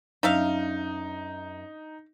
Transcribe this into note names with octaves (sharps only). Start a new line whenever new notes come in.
F#2 D4 D#4 E5 F5